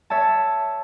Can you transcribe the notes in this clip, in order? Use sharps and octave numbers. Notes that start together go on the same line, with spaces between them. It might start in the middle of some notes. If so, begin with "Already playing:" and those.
C#5 E5 A5